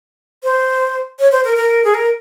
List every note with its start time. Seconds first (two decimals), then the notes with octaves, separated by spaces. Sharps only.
0.44 C5
1.19 C#5
1.32 C5
1.45 A#4
1.56 A#4
1.84 G#4
1.94 A#4